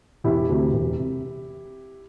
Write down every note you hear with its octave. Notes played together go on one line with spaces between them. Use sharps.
E1 E4 G4
D2 C3
E1
C3